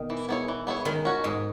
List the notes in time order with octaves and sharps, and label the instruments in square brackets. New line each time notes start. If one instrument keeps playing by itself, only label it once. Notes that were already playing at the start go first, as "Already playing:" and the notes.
Already playing: [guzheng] B2 D#3
[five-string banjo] E3
B3 E4 G#4 C#5
E3
B3 E4 G#4 C#5
[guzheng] D#3 [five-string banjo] G#3
[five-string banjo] C#4 F#4
[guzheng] G#2 [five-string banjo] G#3